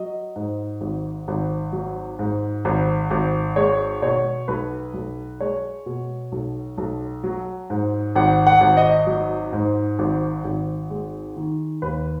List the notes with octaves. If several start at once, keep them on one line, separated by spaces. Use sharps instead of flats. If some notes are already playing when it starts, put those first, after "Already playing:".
Already playing: F#3 D#5
G#2
G#1
G#1
F#3
G#2
G#1
G#1
G#3 C#5
B2 C#5
B1 B4
B1
G#3 C#5
B2
B1
B1
F#3
G#2
G#1 F#5
F#5
G#1
D#5
F#3
G#2
G#1
G#1
G#3
D#3
D#2 B4